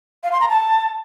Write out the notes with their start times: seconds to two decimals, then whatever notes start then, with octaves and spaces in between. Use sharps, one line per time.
0.23 F5
0.32 C6
0.41 A#5
0.49 A5